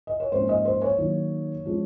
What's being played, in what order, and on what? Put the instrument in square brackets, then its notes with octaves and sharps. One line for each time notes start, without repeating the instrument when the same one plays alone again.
[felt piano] D#5
C#5
G#2 F3 A#3 C#4 C5
D#5
C5
C#5
D#3 F#3 A#3 D#4
F3 G#3 C#4